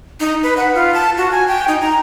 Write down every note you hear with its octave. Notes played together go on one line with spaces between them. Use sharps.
D#4
B4
F#5
F4
A5
F#4
G#5
G5
D#4
A#5